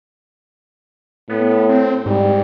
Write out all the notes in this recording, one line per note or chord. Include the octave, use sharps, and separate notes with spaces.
A2 B3
C4
G#2 G3